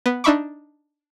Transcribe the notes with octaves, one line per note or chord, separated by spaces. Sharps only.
B3
D4 D#4 E5 B5 C#6 D6